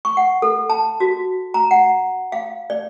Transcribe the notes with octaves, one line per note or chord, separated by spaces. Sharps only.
C#6
F#5
A4
A5
F#4
A#5
F#5
F5
D5